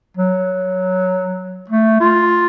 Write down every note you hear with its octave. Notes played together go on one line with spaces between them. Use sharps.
F#3
A3
F4